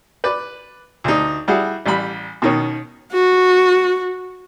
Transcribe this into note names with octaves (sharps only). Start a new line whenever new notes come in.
B4 D5
D2 D4 D#4
G3 E4 F#4 G#4
A1 G3 B5
B2 D#3 C#4
F#4